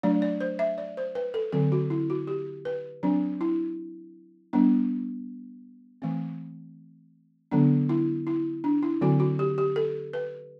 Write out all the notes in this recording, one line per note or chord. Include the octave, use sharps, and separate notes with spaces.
F#3 A3 D4 D5
D5
C5
E5
D5
C5
B4
A4
D3 F#3 C4 A4
F#4
E4
F#4
G4
B4
F#3 C4 D4
E4
G3 B3 D4
E3 A3 C4
D3 F#3 B3 D4
E4
E4
D4
E4
D3 F#3 C4 F#4
F#4
G4
G4
A4
B4